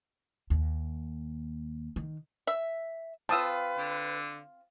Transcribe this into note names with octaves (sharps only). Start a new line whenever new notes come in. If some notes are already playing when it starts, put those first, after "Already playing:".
D#2
D#3
E5
C4 F4 B4 A5 D#6 E6
D3